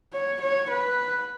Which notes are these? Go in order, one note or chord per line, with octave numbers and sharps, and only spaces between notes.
C#5
C#5
B4